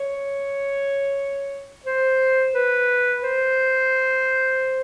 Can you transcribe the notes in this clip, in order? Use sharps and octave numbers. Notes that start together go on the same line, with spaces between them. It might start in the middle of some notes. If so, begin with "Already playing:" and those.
Already playing: C#5
C5
B4
C5